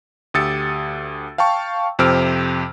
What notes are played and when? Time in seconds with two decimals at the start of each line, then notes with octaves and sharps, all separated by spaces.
0.34 D2 G4 D#6 E6 A6 C#7
1.38 F5 G5 A5 C#6
1.99 F2 C3 C5 E6 F6 D7